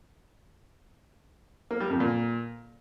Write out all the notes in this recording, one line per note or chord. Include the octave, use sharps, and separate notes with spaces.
A#3
G3
F2
A#2